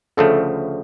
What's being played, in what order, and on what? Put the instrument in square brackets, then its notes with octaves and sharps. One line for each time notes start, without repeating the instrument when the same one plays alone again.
[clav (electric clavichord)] D2 C#3 F3 A3 [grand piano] A4